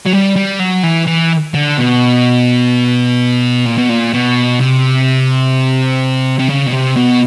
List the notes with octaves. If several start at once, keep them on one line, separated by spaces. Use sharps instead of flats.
F#3
G3
G3
F#3
E3
E3
D3
B2
A#2
B2
A#2
B2
C3
C3
C#3
B2
C3
B2